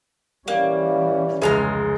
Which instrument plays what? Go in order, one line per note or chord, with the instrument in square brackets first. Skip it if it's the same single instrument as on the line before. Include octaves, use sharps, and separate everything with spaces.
[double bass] E3 C#4 [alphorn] G3 [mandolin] A#3
[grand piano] F1 C#2 G#3 [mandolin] G#4 A#5 F6